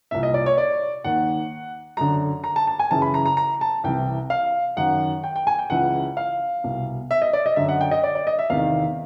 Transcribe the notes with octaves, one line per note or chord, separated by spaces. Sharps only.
C2 A#2 E5
D#5
D5
C#5
D5
D#2 D#3 F#5
F#2 D3 A#5
A#5
A5
A5
G#5
F#2 C#3 E3 A5
B5
A#5
A#5
A#5
A5
C2 C3 E3 G5
F5
F#2 D#3 F#5
G5
G5
G#5
G5
C#2 C#3 E3 F#5
F5
C2 B2
E5
D#5
D5
D#5
F#2 D3 E5
F#5
G5
D#5
D5
D5
D#5
E5
E2 C3 D#3 F5